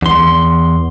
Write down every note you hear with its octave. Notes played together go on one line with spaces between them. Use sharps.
E2 C6